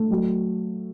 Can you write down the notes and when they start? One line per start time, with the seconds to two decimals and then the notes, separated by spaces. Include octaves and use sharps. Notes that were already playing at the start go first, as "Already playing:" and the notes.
Already playing: A3
0.10 F#3